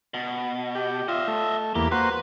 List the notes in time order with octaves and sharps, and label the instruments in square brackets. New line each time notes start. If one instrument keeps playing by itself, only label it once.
[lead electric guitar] B2
[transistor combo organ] G4
[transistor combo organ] F4 [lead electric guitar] D#5 E5
[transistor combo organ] A3
[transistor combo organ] E2 A#3 [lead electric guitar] G4
[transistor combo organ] A#3 F#4 C5 [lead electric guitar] B4